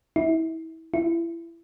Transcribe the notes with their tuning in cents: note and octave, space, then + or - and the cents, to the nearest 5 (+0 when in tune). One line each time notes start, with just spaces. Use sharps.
E4 -30
E4 +25